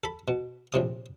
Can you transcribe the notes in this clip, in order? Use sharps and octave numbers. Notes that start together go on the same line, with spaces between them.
A4 B5
B2
A#1 A2 C3 D#6